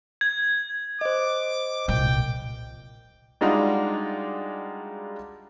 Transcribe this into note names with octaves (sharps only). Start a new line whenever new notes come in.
G#6
C5 D#5 D6
C2 A#2 G5
G3 G#3 D4 D#4 F4 F#4